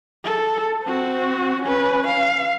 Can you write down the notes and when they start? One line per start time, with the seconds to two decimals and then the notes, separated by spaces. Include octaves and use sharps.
0.24 A4
0.84 C4 F#4
1.63 C#4 B4
2.08 F5